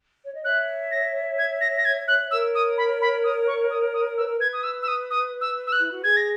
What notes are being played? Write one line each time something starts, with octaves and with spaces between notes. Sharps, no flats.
C#5
D#5
C#5 E5 F#6
A#6
G#6
A#6
A#6
G#6
F#6
A#4 C#5 E6
D#6
B5
B5
D#6
C#6
D#6
D#6
B4 E6
A#4
B4 G#6
D#6
E6
E6
D#6
D#6
E6
E6
F#6
E4
F#4
G#4 G#6
A#6